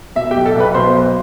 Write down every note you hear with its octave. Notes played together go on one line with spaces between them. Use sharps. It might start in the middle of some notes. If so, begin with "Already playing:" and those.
B2 E5
G4 G5
B1
A4 A5
B1 B4 B5
B2 C5 C6
B1